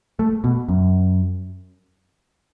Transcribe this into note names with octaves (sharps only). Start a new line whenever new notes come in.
A3
B2
F#2